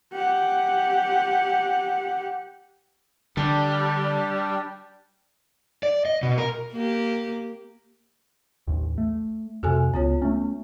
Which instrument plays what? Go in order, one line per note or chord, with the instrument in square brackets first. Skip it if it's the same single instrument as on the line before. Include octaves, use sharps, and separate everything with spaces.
[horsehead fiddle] G4 F#5
[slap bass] D3 [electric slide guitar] G3 [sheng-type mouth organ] D4 G4 D5 [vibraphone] A5
[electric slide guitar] D5
D#5
B2
A#4
[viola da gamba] A#3 G4
[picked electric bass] A1 D#2
A3
[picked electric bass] F2 C3 [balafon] F#4 A4 G#5
[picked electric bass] C#2 [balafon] B3 F4 C#5
[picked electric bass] A3 C#4 [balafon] B3